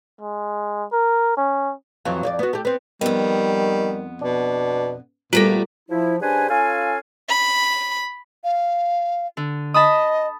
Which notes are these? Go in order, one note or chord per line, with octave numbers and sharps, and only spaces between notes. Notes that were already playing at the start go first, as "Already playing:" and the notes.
G#3
A#4
C#4
F2 E3 F#3
F2 C#5 D5
B3 F#4
A3 G4
B3 C4
F2 D#3 G3 B3
B2 D4
D2 A#2 G3 A3 B3 F4 A4
F3 E4
C#3 G3 D4 B4 C5 G#5
C#4 F4 A4 F5 G#5
B5
F5
D3
D#5 A5 B5 D#6